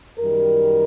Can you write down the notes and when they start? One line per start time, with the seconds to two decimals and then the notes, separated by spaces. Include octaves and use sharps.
0.18 F#2 D#3 G3 A#4